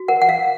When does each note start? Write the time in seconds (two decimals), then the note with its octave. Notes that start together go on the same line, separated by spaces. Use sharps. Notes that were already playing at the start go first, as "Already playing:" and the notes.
Already playing: F#4
0.08 A#4 F#5
0.22 F#5
0.29 A#4 F5